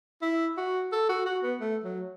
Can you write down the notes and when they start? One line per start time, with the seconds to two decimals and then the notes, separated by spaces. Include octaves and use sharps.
0.22 E4
0.57 F#4
0.92 A4
1.09 F#4
1.26 F#4
1.43 B3
1.60 A3
1.84 F#3